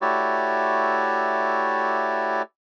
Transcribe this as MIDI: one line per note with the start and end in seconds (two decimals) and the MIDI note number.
0.02 2.42 57
0.02 2.42 64
0.02 2.42 66
0.02 2.42 67
0.02 2.42 73
0.02 2.42 74